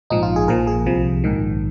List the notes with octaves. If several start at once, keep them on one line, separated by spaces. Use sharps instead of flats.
A#1 G#2 F3 D#4
F4
G#4
A#1 A#2 F3 A#4
G#4
C2 C3 F3
A#1 G#2 D#3